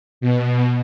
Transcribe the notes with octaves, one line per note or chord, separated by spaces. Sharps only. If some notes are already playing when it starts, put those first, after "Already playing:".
B2